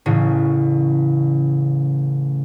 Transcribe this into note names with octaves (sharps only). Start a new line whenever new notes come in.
A1 A2 C#3